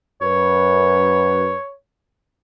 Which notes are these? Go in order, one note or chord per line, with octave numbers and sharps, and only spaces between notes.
F#2 B4 C#5